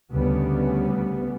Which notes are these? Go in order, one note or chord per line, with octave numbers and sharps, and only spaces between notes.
D2 C#3 G3 B3